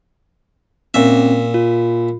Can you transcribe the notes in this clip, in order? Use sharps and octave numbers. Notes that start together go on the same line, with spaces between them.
A#2 C4 C#4 E5
F4